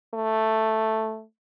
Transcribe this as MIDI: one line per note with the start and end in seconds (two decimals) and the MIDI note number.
0.14 1.23 57